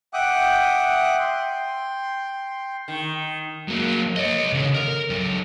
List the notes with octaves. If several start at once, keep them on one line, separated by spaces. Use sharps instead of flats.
E5 F#5 G5 D6 D#6 F#6
G5 C6
D#3
F#3 A#3
C#5 D#5
C#3 A4
A#4
F#3 A4